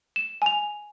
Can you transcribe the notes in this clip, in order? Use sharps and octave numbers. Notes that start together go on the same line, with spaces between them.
E7
G#5 F7